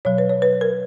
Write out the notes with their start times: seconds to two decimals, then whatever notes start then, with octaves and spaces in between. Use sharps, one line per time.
0.05 B2 F#3 C#5
0.18 B4
0.29 C#5
0.42 B4
0.61 A#4